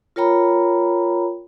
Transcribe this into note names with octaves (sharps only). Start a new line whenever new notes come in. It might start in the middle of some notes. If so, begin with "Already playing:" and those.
F4 A#4 C#5 G5 A#5 B5